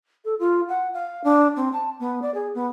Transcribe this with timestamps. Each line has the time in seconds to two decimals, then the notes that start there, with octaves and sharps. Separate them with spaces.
0.25 A4
0.39 F4
0.69 F#5
0.94 F5
1.24 D4
1.56 C4
1.73 A5
2.00 B3
2.22 D5
2.34 G#4
2.55 B3